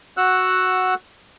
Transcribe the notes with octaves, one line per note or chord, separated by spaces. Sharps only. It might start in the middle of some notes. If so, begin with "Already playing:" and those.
F#4 F#5 E6 F#6